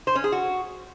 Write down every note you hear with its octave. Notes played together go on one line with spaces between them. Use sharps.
C5
C#4
G#4
F#4